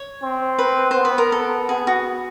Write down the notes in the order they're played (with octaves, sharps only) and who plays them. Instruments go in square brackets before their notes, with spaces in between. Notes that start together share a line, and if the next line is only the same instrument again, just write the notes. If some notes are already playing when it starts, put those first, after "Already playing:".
Already playing: [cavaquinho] C#5
[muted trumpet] C4
[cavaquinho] B4
[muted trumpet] B3 [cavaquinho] C5
[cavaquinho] B4
A#4
A4
[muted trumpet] B3 [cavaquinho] G#4
[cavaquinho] F#4